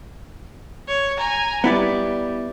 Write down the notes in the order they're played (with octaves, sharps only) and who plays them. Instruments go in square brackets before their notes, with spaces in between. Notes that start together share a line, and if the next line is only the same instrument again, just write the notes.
[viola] C#5
G#5 A#5
[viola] G3 [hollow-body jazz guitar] B3 E4 D5